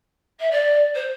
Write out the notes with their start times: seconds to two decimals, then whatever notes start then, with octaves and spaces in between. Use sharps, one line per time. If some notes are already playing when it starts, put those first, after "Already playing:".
0.40 E5
0.51 D5
0.95 C5